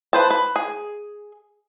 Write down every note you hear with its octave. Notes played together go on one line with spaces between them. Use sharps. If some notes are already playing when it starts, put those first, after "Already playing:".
B4 C5 A5
B4
G#4